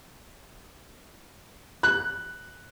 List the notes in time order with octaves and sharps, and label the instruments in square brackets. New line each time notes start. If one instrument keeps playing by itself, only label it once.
[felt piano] F#6